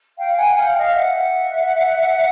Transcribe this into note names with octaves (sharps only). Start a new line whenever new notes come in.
F5 G5
F#5 G#5
G#5
F5 G5
D#5 F5
E5 F#5